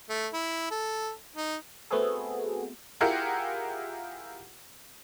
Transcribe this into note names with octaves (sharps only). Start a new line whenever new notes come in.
A3
E4
A4
D#4
A3 B3 C4 F#4 G#4 A4
E4 F4 G4 G#4 A#4 F#5